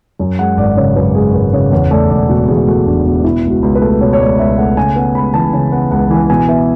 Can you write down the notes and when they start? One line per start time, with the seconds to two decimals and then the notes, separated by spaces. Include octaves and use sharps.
0.20 F#2
0.39 G#3 F#5
0.57 G#1 D5
0.77 C#3 C#5
0.96 F#2 B4
1.15 G#3 G#4
1.34 G#1 B4
1.53 C#3 C#5
1.72 E2 C#5
1.91 A3 D5
2.10 E1 D5
2.29 B2 F#4
2.48 E2 G#4
2.67 A3 F#4
2.86 E1 D4
3.05 B2 D4
3.24 B2 E4
3.44 C#2
3.50 F#4
3.62 C#2
3.75 B4
3.82 A3
4.01 B2 C#5
4.13 C#5
4.19 C#2 D5
4.39 C#2 E5
4.58 A3 F#5
4.77 C#3 G#5
4.96 B3 F#5
5.15 C#2 B5
5.34 E3 A5
5.53 C#3 G#5
5.72 B3 F#5
5.91 C#2 F#5
6.10 E3 G#5
6.30 B2 G#5
6.48 B3 E5